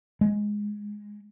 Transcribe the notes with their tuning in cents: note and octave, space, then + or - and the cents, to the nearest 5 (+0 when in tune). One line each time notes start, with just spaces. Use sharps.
G#3 +0